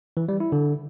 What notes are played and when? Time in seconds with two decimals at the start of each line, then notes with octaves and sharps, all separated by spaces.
0.17 E3
0.29 G3
0.40 E4
0.52 D3